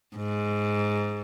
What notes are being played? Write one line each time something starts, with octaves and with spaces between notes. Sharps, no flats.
G#2